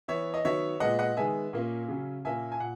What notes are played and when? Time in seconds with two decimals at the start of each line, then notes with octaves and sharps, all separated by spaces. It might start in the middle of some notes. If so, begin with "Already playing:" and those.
0.08 E3 B3 C#5 E5
0.34 D#5
0.45 D#3 F#3 B3 C#5 E5
0.80 A#2 G#3 B3 D#5 F#5
0.99 D#5 F#5
1.17 D#3 G#3 B3 E5 G#5
1.53 A#2 A#3 C#4
1.88 C#3 F#3 C#4
2.25 A#2 A#3 C#4 E5 G#5
2.52 G#5
2.60 A#2 F#5